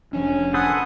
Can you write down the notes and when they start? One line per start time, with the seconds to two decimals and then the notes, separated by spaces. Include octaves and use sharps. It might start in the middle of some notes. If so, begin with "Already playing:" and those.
0.13 F1 F3 C#4 D4
0.54 A4 B4 C5 F#5 G#5 D#6